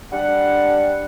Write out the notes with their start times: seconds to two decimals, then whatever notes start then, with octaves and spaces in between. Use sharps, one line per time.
0.12 G3 D4 F#5